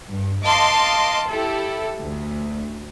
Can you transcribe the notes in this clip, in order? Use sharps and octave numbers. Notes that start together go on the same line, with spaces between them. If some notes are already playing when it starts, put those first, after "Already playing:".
G2
D#5 F5 A5 C6 D6
E4 G4 A4
D2